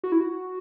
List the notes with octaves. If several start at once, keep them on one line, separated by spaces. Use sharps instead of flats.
F#4
E4
F#4